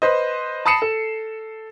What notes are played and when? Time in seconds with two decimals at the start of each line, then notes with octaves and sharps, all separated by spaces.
0.02 B4 C5 D#5
0.66 A5 B5 D#6 C7 C#7 E7
0.82 A4